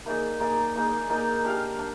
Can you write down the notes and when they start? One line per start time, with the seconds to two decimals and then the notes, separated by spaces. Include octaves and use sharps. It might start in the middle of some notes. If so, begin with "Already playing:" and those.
0.06 A#3 D#4 G#4 D5
0.40 A#3 D#4 G#4 D5
0.75 A#3 D#4 G#4 D5
1.10 A#3 D#4 G#4 D5
1.44 D4 G4 A#4 F5
1.79 D4